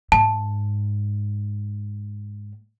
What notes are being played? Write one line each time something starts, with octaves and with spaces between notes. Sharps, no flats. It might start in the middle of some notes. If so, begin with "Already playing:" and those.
G#2 A5